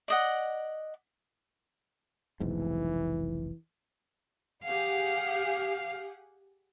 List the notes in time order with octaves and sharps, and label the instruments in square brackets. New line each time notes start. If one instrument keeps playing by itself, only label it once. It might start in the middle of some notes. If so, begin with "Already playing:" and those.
[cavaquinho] D5 D#5 F#5
[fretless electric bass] F1 B1 G#2 [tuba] E3
[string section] G4 G#4 F#5 [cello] F5